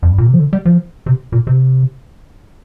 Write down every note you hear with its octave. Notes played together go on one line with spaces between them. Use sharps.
F2
G2
A#2
C3
F3
D3
G3
F3
C3
A#2
C3